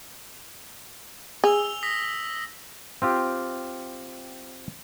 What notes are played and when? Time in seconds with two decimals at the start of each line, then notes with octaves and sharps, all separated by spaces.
1.44 G#4 E6 F7 G7
1.83 D#6 A#6 B6
3.02 C4 F4 G4